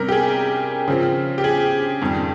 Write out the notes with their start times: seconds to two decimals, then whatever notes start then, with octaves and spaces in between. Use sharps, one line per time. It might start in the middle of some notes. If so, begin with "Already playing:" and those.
Already playing: C3 G3 C#4 A#4
0.08 G4
0.12 G#4
0.88 C#3 F3 C4
1.38 G4
1.44 G#4
2.02 F2 D#3 G3